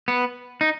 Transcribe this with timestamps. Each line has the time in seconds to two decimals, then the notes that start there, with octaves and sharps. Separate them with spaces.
0.08 B3
0.61 D#4